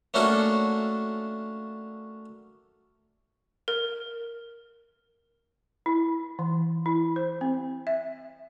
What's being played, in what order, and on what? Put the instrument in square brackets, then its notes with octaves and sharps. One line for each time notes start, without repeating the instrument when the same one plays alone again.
[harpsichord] A3 A#3 C#4 D4 F#4 A4
[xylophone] A#4
[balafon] E4
E3
E4
C5
C4
E5